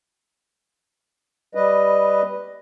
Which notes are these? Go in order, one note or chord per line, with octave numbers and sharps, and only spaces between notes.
G3 B4 D#5